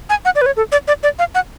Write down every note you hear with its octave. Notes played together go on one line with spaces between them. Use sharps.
G#5
F#5
D5
B4
C#5
A4
D5
D5
D5
F5
F#5